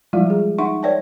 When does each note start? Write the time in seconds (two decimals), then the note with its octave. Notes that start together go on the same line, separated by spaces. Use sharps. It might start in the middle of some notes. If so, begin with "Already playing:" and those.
0.13 F3 G3 G#3 E4 F4
0.26 G3 G#3 G#4
0.58 D#4 E5 F#5 C6 C#6
0.83 B4 C#5 D5 E5 G5 A5